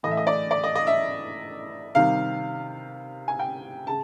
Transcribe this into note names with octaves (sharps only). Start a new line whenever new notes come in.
A2 E3 A3 D#5
E5
D#5
D5
D5
D#5
D#5
E5
C3 D#3 G3 F5
G#5
G5
C#3 A5